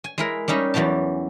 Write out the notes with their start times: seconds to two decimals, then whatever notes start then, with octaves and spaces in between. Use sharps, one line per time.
0.04 G#5
0.18 G#3 E4 A#4
0.48 G3 C#4 D#4 E5
0.74 E2 E3 F#3 G4 A5